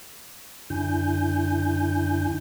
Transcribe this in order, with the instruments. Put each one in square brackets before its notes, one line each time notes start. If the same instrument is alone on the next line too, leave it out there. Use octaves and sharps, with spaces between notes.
[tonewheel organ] F#2 D3 D4 E4 G#5 G6